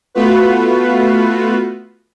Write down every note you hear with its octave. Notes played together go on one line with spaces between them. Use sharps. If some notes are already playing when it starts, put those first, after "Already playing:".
A3 B3 F4 F#4 B4